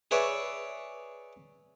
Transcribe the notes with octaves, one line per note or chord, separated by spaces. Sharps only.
G#4 B4 C#5 D5 E5